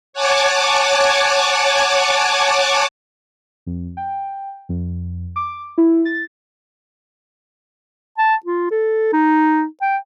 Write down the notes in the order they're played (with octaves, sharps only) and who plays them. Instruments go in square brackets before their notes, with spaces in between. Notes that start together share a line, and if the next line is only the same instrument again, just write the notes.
[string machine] C#5 F#5 G#5 A5 D6
[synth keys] F2
G5
F2
D6
E4
A6
[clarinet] A5
F4
A4
D#4
G5